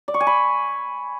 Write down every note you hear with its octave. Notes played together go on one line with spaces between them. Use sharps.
D5
C#6
G#5
B5